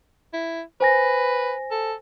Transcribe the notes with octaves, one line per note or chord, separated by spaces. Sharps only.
E4
B4 C5 G#5 A#6
A4